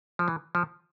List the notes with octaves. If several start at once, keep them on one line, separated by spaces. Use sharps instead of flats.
F3
E3
F3